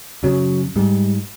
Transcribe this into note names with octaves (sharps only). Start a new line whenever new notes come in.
F#2 C#3 F#3
G#2 G3